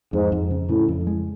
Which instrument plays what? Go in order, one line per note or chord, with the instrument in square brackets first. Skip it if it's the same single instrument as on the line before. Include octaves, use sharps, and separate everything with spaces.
[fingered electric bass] F2 [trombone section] G#2
[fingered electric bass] F2
C#3
[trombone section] A2 [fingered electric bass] C#3
[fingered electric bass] F2
G#3